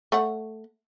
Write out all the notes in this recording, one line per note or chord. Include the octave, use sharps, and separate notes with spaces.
A3 C#5 F#5